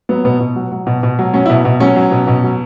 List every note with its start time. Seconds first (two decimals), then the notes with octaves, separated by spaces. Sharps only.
0.09 F#3 B3
0.25 B2 B3
0.40 B2
0.56 F#3
0.72 F#3
0.87 B2
1.03 B2
1.19 F#3
1.34 F#3 C#4
1.46 E4
1.50 B2
1.65 B2
1.80 F#3 C#4
1.96 F#3
2.11 B2
2.27 B2
2.44 F#3